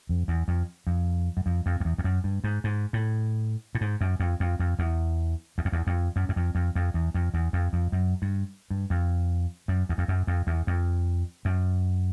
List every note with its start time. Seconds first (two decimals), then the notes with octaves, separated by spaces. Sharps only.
0.09 F2
0.28 E2
0.48 F2
0.87 F2
1.37 F#2
1.46 F2
1.66 F2
1.80 F2
1.85 E2
1.98 F2
2.04 F#2
2.24 G2
2.44 G#2
2.64 G#2
2.93 A2
3.75 A2
3.81 G#2
4.01 F#2
4.20 F2
4.40 F2
4.59 F2
4.79 E2
5.58 E2
5.65 F2
5.72 E2
5.87 F2
6.16 F#2
6.29 F#2
6.36 F2
6.55 F2
6.75 F2
6.94 E2
7.14 F2
7.34 E2
7.53 F2
7.73 F2
7.92 F#2
8.22 G2
8.70 G2
8.90 F2
9.68 F#2
9.89 E2
9.98 F2
10.08 F#2
10.27 F2
10.47 E2
10.67 F2
11.45 F#2